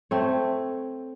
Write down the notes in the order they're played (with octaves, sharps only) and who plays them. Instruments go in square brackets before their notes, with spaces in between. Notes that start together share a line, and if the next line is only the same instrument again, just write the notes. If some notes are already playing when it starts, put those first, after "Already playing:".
[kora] A3 C4 C#5